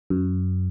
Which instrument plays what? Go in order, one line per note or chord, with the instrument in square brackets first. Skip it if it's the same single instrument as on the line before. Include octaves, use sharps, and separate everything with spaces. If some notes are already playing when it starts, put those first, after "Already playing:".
[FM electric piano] F#2